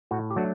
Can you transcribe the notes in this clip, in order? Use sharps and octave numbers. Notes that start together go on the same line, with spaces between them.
A2 F#4
G4
F#3 A3 D4 F#4